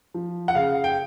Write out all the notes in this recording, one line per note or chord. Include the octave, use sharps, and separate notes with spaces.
F3
F#5
C#3 F5
G5